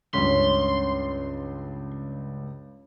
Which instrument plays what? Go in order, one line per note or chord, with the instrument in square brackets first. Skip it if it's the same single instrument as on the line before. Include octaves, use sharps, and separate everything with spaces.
[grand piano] C#2 G2 [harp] C#4 B6 [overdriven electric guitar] C6